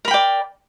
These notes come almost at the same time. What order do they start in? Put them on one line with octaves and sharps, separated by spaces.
A#4 B5 G5 D5